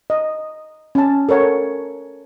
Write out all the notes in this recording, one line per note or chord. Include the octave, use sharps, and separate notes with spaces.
D#5
C#4 A5
A4 A#4 C#5 F#5